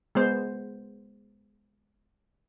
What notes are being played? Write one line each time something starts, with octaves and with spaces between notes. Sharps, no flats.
G#3 B3 C5